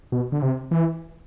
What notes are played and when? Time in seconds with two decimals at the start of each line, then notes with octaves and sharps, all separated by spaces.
0.12 B2
0.32 D3
0.42 C3
0.71 E3